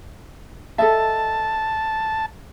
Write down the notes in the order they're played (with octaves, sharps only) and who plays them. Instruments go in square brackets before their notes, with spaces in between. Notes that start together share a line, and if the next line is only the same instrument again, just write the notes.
[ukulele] A4 D#5 E5 [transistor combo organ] A5